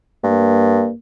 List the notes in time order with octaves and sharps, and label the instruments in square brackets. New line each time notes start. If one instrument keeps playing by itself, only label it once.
[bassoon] G2 [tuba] A#3